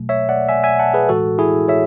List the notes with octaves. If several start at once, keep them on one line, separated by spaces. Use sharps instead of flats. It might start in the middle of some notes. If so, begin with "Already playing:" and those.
Already playing: B2 F#3 A3
C#5 E5
D5 F#5
E5 G#5
E5 G#5
F#5 A5
G#4 B4
A2 E3 G#3 F#4 A4
E4 G#4
C#5 E5